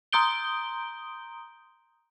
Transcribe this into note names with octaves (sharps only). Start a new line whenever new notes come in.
A#5 C6 D#6 G6 D7 G7